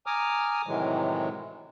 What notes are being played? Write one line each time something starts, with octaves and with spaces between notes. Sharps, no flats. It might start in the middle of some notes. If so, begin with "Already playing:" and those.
G#5 A#5 D6 D#6 F6
A2 C3 D#3 E3 F#3 G#3